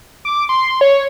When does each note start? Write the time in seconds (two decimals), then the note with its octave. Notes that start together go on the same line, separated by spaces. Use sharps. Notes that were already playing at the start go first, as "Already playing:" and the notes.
0.25 D6
0.49 C6
0.81 C#5